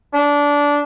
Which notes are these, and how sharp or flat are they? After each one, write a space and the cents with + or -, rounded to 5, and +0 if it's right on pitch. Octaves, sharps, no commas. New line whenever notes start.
D4 -20